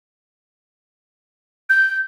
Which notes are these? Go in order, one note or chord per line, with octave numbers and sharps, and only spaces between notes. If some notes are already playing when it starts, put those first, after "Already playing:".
G6